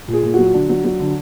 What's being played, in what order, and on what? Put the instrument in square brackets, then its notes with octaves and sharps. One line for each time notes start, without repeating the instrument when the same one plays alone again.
[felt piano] A#2
G#4
A#2
F#3 F#4
D3 D4
F#3
F#3
D3